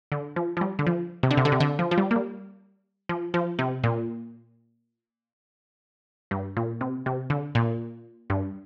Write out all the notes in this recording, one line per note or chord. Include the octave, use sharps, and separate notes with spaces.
D3
F3
F3
G3
D3
F3
C3
D3
C3
D3
C3
D3
F3
F3
G3
A#3
G3
F3
F3
C3
A#2
G2
A#2
C3
C3
D3
A#2
G2